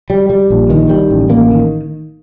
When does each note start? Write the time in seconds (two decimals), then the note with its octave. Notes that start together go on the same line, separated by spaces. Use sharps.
0.10 G3
0.30 G3
0.50 A#1
0.70 D#3
0.90 G3
1.10 A1
1.30 A#3
1.51 D#3